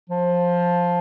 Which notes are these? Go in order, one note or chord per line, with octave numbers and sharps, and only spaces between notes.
F3